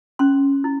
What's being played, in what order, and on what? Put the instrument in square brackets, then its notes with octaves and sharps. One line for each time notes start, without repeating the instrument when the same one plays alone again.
[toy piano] C#4 C6
E4